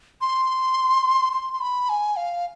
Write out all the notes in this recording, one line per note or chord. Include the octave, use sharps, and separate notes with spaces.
C6
C6
C6
B5
G#5
F5